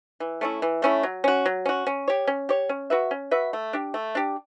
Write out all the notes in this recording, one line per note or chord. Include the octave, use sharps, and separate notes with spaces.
E3
A3 C#4 E4
E3
A3 C#4 E4
F#3
C#4 F#4
F#3
C#4 F#4
C#4
G4 C#5
C#4
G4 C#5
C#4
F#4 B4 E5
C#4
F#4 B4 E5
A3
D4 G4
A3
D4 G4